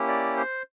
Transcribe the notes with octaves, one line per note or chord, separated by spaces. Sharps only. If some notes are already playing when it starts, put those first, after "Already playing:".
Already playing: A#3 C#4 E4 G4
D5
C5